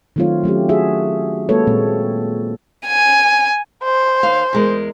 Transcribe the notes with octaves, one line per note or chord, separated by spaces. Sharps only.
D#3 F#3 A3 C4 F4 C#5
F#3 A3 C#4 G4
F#4 G#4 E5
G#3 A#3 F#4 A4 B4 C#5
A#2 G#3 C4
G#5
C5
D#2 F5
E2 G#3 A#4